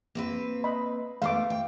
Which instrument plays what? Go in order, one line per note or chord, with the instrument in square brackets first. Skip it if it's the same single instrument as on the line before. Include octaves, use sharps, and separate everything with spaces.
[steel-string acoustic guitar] A#3 C4 B4
[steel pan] D#5 B5
[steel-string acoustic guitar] A3 B3 [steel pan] F5 D6
[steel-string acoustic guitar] G5